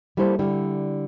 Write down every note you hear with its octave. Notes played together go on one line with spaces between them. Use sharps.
G3 A#3 E4 A4 C5
D3 G3 E4